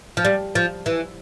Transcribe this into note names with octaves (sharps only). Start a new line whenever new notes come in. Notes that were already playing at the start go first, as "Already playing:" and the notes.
F3
G3
F3
E3